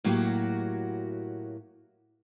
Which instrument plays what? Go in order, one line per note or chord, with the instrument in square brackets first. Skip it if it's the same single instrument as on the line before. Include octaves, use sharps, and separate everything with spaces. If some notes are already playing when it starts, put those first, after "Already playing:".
[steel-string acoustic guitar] A2 F#3 A#3 F#4 G4